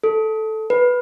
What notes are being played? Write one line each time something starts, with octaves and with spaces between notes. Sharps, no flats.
A4
B4